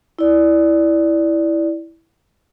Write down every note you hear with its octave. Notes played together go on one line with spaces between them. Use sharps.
E4 D5